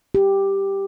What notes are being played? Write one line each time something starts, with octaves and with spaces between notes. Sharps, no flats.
G4